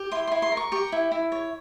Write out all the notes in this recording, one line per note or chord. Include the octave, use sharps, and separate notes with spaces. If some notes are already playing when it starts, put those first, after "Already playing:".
Already playing: G4
E4 C6
E4 C6
C6
A#4
C#6
G4 C#6
E4
E4
C#5